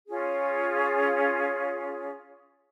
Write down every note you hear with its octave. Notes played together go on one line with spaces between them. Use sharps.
C#4 F4 G#4